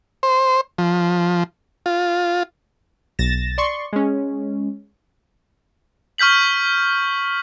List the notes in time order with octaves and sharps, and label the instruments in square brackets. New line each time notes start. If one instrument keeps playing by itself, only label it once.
[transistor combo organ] C5
F3
F4
[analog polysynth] B1 A6 A#6 E7
D5 C6 C#6
G#3 C#4
[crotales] C#6 F6 G6 B6 F#7